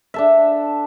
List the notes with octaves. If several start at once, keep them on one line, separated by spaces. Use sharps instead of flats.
D4 A4 E5